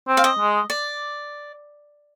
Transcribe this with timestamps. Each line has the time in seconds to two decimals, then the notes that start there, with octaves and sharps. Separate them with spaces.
0.08 C4
0.17 F5
0.24 D#5
0.39 G#3
0.70 D5